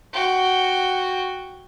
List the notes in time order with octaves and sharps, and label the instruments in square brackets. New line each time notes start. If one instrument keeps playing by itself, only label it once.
[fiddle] F#4 G5